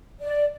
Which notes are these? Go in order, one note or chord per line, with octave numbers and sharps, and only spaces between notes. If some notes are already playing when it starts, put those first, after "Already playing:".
D5